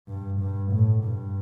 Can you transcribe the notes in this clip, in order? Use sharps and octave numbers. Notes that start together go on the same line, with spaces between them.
G2
G2
A2
G2